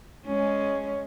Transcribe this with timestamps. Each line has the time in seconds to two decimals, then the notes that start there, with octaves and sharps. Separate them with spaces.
0.25 G#3 C#4